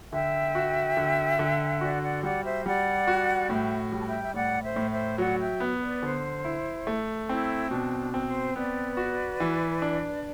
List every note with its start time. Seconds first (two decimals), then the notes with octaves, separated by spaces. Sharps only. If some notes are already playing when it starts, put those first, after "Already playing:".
0.13 D3 E5 G5
0.55 F#4
0.97 D3
1.39 D3
1.81 F#4 D5 F#5
2.02 D5 F#5
2.23 G3 D5 F#5
2.44 C5 E5
2.65 G3 D5 F#5
3.07 F#4
3.50 A2 E5 G5
3.92 G3
4.00 A5
4.06 E5 G5
4.24 E5
4.34 A2 D5 F#5
4.62 C5 E5
4.76 A2
4.90 C5 E5
5.18 F#3 D5 F#5
5.40 E5 G5
5.60 B3
5.81 B4 D5
6.03 D3 C5
6.45 E4
6.87 A3
7.28 C4 E4
7.71 B2 D4
7.99 D4
8.14 C4
8.27 C5
8.55 B3 B4 D5
8.97 F#4
9.40 E3
9.82 D4